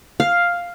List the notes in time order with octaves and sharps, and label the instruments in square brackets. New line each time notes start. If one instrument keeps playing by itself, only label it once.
[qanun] F5